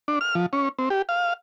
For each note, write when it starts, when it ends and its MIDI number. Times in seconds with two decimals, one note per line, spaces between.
0.08 0.19 62
0.21 0.35 89
0.35 0.46 53
0.53 0.69 61
0.79 0.89 60
0.90 1.02 67
1.09 1.33 77